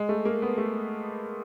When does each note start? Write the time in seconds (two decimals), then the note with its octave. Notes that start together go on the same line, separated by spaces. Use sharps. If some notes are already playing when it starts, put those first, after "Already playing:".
Already playing: G#3
0.09 A3
0.25 A#3
0.42 B3
0.58 A3